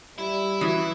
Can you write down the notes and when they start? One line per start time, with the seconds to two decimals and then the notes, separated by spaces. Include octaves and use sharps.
0.18 G3 E4
0.61 E3 F#3 D#6